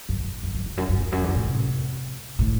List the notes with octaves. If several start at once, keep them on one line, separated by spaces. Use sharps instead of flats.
F#2
F#2
F#2
F#2
E2
F#2
F#2
E2
F#2
E2
A2
C3
A2